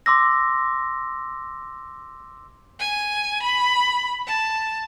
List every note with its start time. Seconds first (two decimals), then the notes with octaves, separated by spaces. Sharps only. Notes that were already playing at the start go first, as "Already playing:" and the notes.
0.06 C6 D6 E6 A#6
2.80 G#5
3.43 B5
4.27 A5